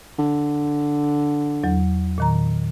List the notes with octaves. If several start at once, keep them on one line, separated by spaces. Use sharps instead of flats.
D3
E2 F#3
A#2 D#3 A#5